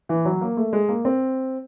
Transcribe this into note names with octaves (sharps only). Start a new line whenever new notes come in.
E3
F#3
A#3
A3
G#3
A#3
C4